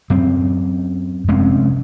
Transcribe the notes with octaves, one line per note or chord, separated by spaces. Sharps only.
F#2 C4
F1 G#3 C4 C#4